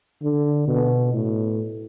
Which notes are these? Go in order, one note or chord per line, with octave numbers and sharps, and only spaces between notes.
D3
B2
A2